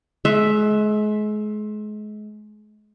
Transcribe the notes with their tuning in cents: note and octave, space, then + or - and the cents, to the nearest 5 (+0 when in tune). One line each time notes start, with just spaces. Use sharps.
G#3 +35 E5 +0